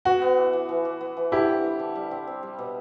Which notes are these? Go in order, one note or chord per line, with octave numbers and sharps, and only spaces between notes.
B3 F#4
B3
E3
E3
E3
E3
B3
E3
D3 E4 G4
C4
G3
D3
G3
C4
C4
G3
B2